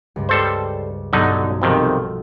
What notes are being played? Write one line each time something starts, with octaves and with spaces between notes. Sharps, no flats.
C#2 G2
G3 A4 B4 C5
B1 G2 D3 F#3 D#4
F2 C3 D#3 F3 A4